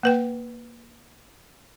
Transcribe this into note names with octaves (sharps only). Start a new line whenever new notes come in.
A#3 B4 G5